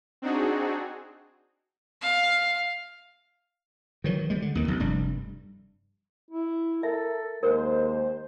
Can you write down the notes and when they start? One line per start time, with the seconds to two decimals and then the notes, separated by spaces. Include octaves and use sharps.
0.22 C4 D4 D#4 F#4 G#4
2.02 F5
4.04 D#3 E3 F#3
4.30 G3 G#3
4.42 D3
4.55 D#2 D#3
4.68 B1
4.80 F1 G2 G3
6.30 E4
6.83 A4 A#4 E5
7.43 D#2 G#3 A#4 C5